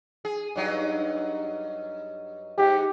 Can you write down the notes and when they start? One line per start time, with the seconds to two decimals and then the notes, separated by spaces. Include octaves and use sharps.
0.25 G#4
0.56 G2 F#3 D#4
2.58 G#2 G4